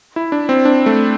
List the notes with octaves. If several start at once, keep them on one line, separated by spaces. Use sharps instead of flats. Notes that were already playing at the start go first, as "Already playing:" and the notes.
E4
D4
C4
D4
A3